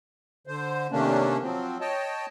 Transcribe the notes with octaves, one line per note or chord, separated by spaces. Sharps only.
D3 C5
C3 D#3 A3 A#3 C#4 D4
F3 F#3 C4
C#5 D#5 G5 A5